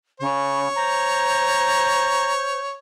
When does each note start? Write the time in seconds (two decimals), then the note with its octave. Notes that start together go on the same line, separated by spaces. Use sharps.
0.20 C#3 C#5
0.75 C5 A#5